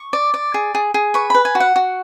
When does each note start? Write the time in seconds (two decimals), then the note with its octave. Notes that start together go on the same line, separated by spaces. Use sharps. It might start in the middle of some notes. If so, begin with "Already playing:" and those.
Already playing: C#6
0.13 D5
0.34 D5
0.54 G#4
0.75 G#4
0.94 G#4
1.14 B4 C#6
1.30 B4 B5
1.45 G#5
1.55 F#4
1.60 F#5
1.76 F#4